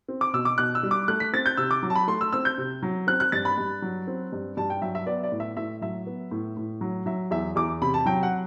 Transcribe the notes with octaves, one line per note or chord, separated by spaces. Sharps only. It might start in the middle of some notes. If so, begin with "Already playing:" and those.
C4
D6
B2 E6
D6
B2 F#6
E6
G3
D6
A3 F#6
B6
C4 A6
G6
C3 E6
D6
F#3
A5
B5
A3 C6
E6
C4 E6
G6
C3
F#3
C4 F#6
F#6
G2 A6
B5
G2
F#3
C4
G2
G2 A5
G5
F#3 E5
E5
B3 D5
D5
A2
E5
A2 E5
F#3 E5
B3
A2
A2
F#3
F#3 E5
E2 E5
E2 D6
C3 B5
A5
F#3 G5
F#5